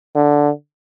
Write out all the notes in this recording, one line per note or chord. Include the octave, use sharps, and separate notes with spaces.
D3